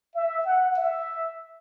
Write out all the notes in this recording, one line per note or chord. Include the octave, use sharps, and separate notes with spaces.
E5
F#5
E5